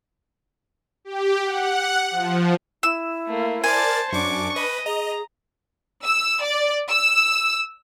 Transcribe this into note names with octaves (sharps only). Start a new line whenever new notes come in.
G4
F#5
F3
E4 E6
A3 A#3
A#4 C5 D5 G#5 A5 A6
F#2 D4 C#6 D6
B4 D#5
G#4 D#5 A#5
E6
D5
E6